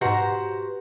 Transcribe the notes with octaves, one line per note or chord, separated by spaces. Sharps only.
G#2 B2 F#4 G4 B4 C5 A#5